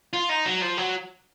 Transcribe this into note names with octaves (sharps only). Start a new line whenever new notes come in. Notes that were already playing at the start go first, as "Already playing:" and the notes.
F4
D#4
F#3
F3
F#3